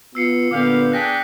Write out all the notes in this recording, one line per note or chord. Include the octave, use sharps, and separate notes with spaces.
B3 F4 E6 C7 C#7
A#2 D3 B3 G4 F5 D6
D4 G#4 G5 F#6 A#6 B6